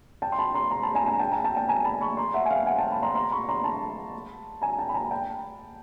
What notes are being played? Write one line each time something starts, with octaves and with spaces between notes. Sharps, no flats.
G5 A5
C6
A5 B5
A#5 C6
A#5 C6
A5 B5
G#5 A#5
G#5 A#5
G5 A5
G#5 A#5
G5 A5
G5 A5
G#5 A#5
A5 B5
B5 C#6
A#5 C6
E5 F#5
G#5
F5 G5
F#5 G#5
G5 A5
A5 B5
A#5 C6
A#5 C6
B5 C#6
A#5 C6
A5 B5
G#5 A#5
G5 A5
B5
G#5 A#5
G5 A5